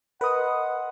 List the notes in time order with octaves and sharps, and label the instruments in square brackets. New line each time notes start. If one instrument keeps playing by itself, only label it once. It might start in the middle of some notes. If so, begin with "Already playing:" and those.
[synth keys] A#4 D#6 [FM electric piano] B4 [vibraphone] D#5 C6 [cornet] F#5